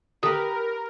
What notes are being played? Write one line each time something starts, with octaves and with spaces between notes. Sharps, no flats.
D3 A3 G4 A#4 B4 D#6